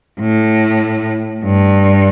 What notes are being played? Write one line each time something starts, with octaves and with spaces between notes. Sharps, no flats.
A2
G2